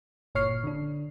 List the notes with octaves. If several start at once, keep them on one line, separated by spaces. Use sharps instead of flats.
G1 A#2 C#5 C#6 F6 C7
D3 D4